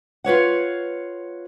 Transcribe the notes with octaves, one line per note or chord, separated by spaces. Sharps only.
F4 B4 C#5 F#5